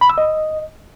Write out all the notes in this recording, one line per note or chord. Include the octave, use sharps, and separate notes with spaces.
B5
E6
D#5